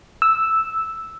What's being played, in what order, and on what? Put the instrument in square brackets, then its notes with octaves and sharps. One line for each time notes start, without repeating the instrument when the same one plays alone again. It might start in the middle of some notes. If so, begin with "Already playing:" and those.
[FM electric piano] E6